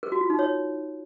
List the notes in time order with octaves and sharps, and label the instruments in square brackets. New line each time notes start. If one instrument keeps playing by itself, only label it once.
[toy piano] A#4
F#4
F4
D#4
C#5